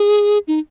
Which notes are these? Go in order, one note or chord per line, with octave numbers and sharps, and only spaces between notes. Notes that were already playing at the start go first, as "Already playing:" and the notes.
Already playing: G#4
D#4